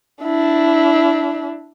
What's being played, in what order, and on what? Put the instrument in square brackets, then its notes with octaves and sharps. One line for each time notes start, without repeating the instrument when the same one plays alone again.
[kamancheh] D4 E4